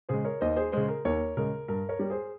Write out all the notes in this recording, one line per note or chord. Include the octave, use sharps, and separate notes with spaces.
C#3 G#3 G#4 C5
A#4 C#5
D#2 C5 D#5
G#4 C5
C#3 G#3 G#4 C5
A#4
D#2 A#4 C#5
C#3 G#3 A#4
G2 A#4
A#4 C#5
G3
G#4 C5